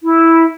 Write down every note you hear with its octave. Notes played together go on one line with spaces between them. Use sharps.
E4